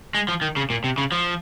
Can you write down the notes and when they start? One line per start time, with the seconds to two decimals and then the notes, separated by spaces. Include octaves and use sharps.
0.15 G#3
0.28 F3
0.42 D#3
0.57 C#3
0.70 A#2
0.84 C3
0.98 C#3
1.12 F3